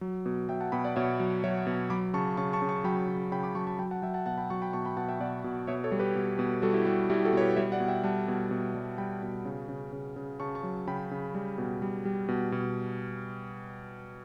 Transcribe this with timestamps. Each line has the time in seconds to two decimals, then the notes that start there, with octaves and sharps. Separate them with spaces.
0.01 F#3
0.26 B2
0.49 F#3 E5 G5
0.61 F#5 A5
0.72 B2 G5 B5
0.84 D5 F#5
0.96 B2 C#5 E5
1.20 F#3
1.44 F#3 C#5 E5
1.67 B2
1.90 F#3 B5 D6
2.14 C#3 A5 C#6
2.37 C#3 A5 C#6
2.53 A5 C#6
2.62 C#3
2.69 A5 C#6
2.84 F#3 G5 B5
3.08 C#3
3.31 C#3 G5 B5
3.43 B5 D6
3.55 F#3 A5 C#6
3.67 A5 C#6
3.79 F#3 G5 B5
3.91 F#5 A5
4.02 F#3 E5 G5
4.14 F#5 A5
4.26 B2 F#5 A5
4.38 G5 B5
4.50 F#3 A5 C#6
4.62 G5 B5
4.73 B2 A5 C#6
4.85 G5 B5
4.97 B2 F#5 A5
5.08 E5 G5
5.20 B2 D5 F#5
5.44 B2
5.67 B2 C#5 E5
5.84 A4 C#5
5.92 G3
5.99 G4 B4
6.15 B2
6.39 B2
6.62 G3 F#4 A4
6.74 E4 G4
6.85 G3 F#4
7.10 G3 E4 G4
7.25 F#4 A4
7.33 B2 C#5
7.40 G4 B4
7.56 G3 C#5 E5
7.72 D5 F#5
7.80 B2
7.88 E5 G5
8.03 G3 F#5 A5
8.28 B2
8.51 B2
8.75 G3
8.98 G3 G5 B5
9.23 B2
9.45 C#3
9.69 C#3
9.93 C#3
10.16 C#3
10.40 C#3 A5 C#6
10.55 A5 C#6
10.63 F#3
10.87 C#3 G5 B5
11.11 C#3
11.34 G3
11.58 B2
11.82 G3
12.05 G3
12.29 B2
12.52 B2